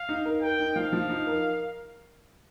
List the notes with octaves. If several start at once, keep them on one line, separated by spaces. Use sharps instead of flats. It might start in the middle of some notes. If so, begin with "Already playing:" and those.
Already playing: F5
D#4
A#4
A#4 G5
D#4
F3 F5
F3
D#4
A#4